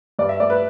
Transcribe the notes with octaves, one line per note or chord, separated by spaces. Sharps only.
G2 D5
E5
A3 D5
B4